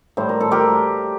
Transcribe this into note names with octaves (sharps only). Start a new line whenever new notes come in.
A2 G3 C5
A#4
A4
G4 A#4